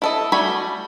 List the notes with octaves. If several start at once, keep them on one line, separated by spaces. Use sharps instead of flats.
E4 A4 D#5
G3 A3 F#4 G#5 B5